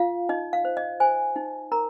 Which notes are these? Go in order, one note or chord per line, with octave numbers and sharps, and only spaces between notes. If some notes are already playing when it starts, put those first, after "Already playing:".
Already playing: F4 F5
D#4 D#5
F5
C5
D#5
C5 G#5
D#4
A#4 A#5